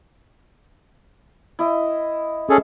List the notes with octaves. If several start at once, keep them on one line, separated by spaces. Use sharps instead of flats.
E4 D#5
C#4 G#4 A4